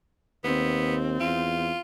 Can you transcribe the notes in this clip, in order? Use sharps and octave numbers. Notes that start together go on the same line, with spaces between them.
D#2 B3 C4
E2 F4